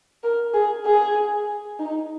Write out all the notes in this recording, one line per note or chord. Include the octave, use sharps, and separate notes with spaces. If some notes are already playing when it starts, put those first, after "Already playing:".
A#4
G#4
G#4
D#4